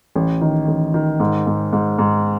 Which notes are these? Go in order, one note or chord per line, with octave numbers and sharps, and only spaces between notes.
A1
D#3
A1
D#3
G#2
G#2
G#2
G#2